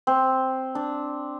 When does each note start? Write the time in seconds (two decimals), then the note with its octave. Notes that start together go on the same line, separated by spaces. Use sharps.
0.07 C4
0.75 D4